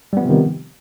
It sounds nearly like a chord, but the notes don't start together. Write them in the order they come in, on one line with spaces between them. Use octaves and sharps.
G3 B3 F3 C3 D#3